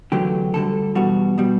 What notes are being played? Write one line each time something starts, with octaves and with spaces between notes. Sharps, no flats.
E2 D3 F#3 A3 G4
D2 D3 G3 A4
E2 B2 G3 F#4
B2 G3